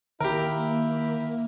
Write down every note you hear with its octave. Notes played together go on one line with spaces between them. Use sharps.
D#3 A#3 E4 G4 A#4